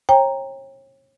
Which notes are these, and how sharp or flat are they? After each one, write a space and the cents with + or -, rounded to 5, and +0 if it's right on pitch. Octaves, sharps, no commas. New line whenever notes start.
C#5 -35 G5 +20 A#5 +0